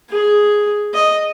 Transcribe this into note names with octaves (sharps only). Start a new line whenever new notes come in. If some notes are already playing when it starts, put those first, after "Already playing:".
G#4
D#5